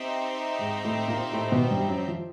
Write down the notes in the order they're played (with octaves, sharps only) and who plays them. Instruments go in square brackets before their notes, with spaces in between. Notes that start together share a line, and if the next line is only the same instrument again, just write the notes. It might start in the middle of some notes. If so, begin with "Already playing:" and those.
Already playing: [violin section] C4 D#4 G4 C5 E5
[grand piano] G#2 G#3
A2 A3
A#2 A#3
A2 A3
B2 B3
G2 G3
F#2 F#3
F3